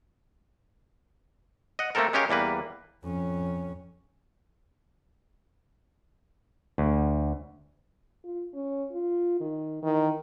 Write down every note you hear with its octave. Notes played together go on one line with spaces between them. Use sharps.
D#5 F#5
A3 A#3 C4 A4 A#4
G#3 C#4 G4 A#4 F5
E2 G3 A#3 B4
F2 C#4
D2
F4
C#4
F4
D#3
D#3 E3